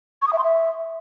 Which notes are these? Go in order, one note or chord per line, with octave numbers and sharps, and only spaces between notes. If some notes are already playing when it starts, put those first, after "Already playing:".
C#6
D#6
E5
C6
E5